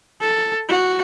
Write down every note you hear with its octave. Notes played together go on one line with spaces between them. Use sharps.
A4
F#4